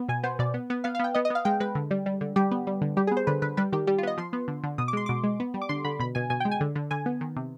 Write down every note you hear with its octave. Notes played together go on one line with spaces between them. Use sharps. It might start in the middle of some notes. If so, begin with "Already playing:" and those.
Already playing: B3
B2 G#5
B3 C5
B2 D5
B3
B3
B3 F5
F5
B3 G5
B3 D#5
D#5
B3 F5
G#3 G5
G#3 B4
D3
G3
G3
D3
G3 G4
B3
G3
D3
G3 G4
G#4
B3
C5
D3 B4
D3 B4
G3 B4
D#3 G4
G3 G4
F4
B3 D#5
F3 C6
B3
D3
D3
B2 D#6
D6
G#3 C6
B2 D6
G#3
B3
G3
D6
D3 C6
D3 B5
B2 B5
B2 G#5
B2 G#5
G#3 G5
G#5
D3
D3
D3 G#5
B3
D#3
C3